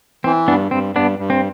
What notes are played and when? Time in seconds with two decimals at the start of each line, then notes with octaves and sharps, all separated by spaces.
0.24 E3 C4
0.48 G2 B3 D4
0.71 G2 C4
0.96 G2 B3 D4
1.19 G2
1.30 C4